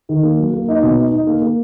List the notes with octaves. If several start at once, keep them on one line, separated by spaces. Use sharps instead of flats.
D#3
A#3
F#3
A#3
D#4
B2
D#4
D#4
A#3
A#3